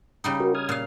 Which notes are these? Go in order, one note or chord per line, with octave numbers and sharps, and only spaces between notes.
C#3 G3 D#4
F#4 A#4
D#6 F6 G#6
A#2 F5